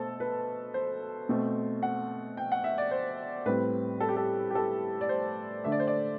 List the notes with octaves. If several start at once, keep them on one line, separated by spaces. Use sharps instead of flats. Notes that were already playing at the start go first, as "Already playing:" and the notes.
Already playing: B2 A3 A4 C5
B4
C5
B2 A3 C4
F#5
G5
F#5
E5
D5
C5
A2 G3 C4 B4
A4
G4
A4
G4
A4
D5
C5
D3 A3 D4 E5
D5
C5
D5